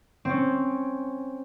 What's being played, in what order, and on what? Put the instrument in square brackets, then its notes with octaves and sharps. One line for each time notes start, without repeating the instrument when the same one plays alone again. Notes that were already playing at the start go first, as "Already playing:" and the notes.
[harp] C4 C#4